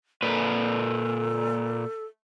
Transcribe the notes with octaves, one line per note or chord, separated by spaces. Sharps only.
A#2 A4 B4